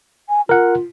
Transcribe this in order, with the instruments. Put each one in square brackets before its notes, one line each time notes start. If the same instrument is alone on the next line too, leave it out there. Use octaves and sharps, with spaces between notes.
[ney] G#5
[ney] F4 [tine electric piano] A#4 F#5